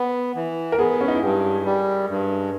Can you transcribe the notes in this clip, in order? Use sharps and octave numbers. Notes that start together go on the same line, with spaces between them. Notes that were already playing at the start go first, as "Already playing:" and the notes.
Already playing: B3
E3
A#4
B3 G#4
C#4
D#4
E4
G2 G4
G3
G2